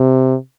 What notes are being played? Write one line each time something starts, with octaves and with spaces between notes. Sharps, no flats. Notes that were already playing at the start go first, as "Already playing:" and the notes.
Already playing: C3